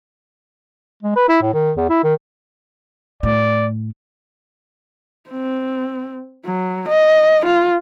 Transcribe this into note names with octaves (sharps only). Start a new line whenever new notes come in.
G#3
B4
E4
A2
D#3
E2
E4
D#3
A2 D5
C4
F#3
D#5
F4